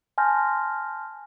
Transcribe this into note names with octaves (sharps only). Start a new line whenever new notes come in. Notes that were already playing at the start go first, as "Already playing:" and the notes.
G#5 A5 C6 F6 G6 A#6